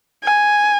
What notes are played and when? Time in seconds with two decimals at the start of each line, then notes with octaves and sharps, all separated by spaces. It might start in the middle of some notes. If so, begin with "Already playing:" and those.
0.24 G#5